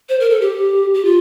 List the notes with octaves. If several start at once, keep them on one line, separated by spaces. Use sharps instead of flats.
C5
A#4
A4
G4
G4
F4